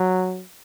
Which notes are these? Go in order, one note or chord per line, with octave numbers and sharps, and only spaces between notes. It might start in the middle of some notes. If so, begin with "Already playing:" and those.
Already playing: F#3